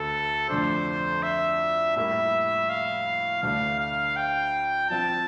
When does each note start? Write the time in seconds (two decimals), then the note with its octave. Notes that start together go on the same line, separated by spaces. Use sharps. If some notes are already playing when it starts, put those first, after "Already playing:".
Already playing: D2 A3 A4
0.49 F2 D3 A3 D4 C5
1.23 E5
1.96 A2 G3 A#3 E4 A#4 E5
2.69 F5
3.43 D2 D3 A3 D4 F5
3.80 F5
4.16 G5
4.89 F3 C4 F4 A5